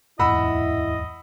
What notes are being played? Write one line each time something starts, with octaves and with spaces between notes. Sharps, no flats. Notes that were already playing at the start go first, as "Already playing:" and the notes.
D1 E2 G#2 E4 D#5 F#5 B5 E6